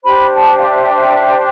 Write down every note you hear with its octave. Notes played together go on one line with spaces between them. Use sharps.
D4 G4 C5 B5
A5
F5
E5
E5